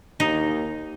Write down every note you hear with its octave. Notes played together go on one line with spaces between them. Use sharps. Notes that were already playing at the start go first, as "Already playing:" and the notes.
D#2 D#4